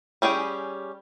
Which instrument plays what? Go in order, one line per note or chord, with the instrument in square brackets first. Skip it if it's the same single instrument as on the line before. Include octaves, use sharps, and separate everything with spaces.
[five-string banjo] G3 C#4 G#4 G5